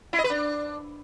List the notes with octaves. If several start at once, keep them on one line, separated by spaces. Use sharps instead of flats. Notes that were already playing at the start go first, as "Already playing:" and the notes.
E4
D#5
B4
D4